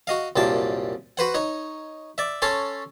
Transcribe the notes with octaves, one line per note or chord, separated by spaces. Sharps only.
F#4 D#5 F5
C2 F#2 A#2 G5 A5
F#4 B4 C5 F#5
D#4 C#5
D5 E5
C#4 A4 C#5 A5 C6